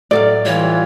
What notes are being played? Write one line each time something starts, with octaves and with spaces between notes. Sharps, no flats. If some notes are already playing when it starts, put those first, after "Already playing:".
A2 F#3 D5 F5
E3 G3 F4 C#5